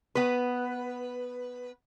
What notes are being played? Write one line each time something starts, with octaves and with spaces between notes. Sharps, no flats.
B3 B4